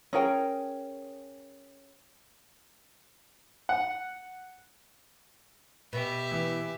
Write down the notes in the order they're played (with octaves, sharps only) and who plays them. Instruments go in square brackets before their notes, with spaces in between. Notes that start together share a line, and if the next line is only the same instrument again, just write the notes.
[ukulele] C#4 G#4 A#4 G5
[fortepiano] F#5
[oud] B2 [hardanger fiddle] G4 E5
[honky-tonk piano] E3